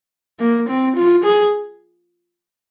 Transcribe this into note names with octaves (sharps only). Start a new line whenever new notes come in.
A#3
C4
F4
G#4